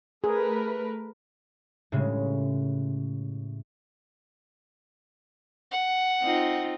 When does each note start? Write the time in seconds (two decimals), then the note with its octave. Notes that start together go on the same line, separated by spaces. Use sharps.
0.24 A3 G#4 A#4 B4
1.92 A2 C#3 G3 G#3
5.71 F#5
6.23 C4 D#4 F4